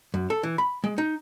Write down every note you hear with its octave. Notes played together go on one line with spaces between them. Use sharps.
F#2
A4
E3
B5
G#3
D#4